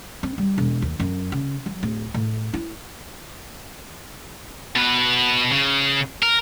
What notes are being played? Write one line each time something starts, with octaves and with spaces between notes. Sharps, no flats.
C4
G3
E1
D#2
F#2
C#3
F#3
D1
A2
E4
B2 B4
C#3
A#4